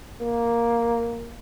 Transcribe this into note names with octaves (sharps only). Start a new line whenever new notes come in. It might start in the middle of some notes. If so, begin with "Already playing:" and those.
A#3